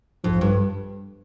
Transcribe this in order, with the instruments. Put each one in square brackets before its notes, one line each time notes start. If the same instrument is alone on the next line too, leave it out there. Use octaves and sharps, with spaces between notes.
[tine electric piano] A#1 G#2 F3 [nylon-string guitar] F2
[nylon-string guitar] G2